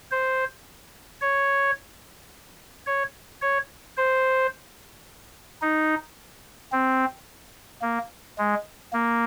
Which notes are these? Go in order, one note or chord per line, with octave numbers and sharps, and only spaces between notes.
C5
C#5
C#5
C#5
C5
D#4
C4
A#3
G#3
A#3